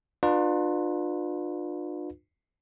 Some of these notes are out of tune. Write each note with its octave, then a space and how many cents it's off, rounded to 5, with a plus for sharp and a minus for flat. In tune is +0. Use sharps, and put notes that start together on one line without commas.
D4 +40 F4 +30 B4 +0